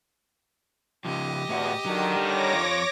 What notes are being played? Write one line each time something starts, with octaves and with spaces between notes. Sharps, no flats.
C#3 F3 G4 D#5
E2 A2 F#4
D3 D#3 F#3
G3 C#5 D6 A#6
F2 F4